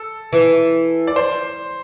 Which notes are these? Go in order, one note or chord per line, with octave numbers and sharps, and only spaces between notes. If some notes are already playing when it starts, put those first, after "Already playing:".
Already playing: A4
E3
D5
C5